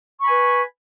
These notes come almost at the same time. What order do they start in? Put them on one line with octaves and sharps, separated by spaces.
C#6 B5 G#5 B4